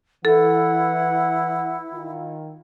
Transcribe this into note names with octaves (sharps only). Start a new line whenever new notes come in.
E3 E4 A4 F#5
D#3 F4